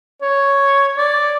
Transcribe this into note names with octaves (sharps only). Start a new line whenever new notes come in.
C#5
D5